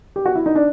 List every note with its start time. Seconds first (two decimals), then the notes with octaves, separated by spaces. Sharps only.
0.16 G4
0.26 F#4
0.36 E4
0.46 D#4
0.55 D4